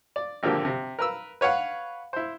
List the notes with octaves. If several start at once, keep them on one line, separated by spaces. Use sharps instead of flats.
D5
G#1 D3 F3 A#3 G4
C3
A#4 B4 E6
B4 C#5 F5 F#5
E4 C5